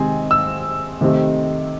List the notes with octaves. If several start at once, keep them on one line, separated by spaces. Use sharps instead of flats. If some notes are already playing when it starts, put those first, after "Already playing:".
Already playing: C3 D#3 G#3 C4 G#5
E6
C3 D#3 A3 C4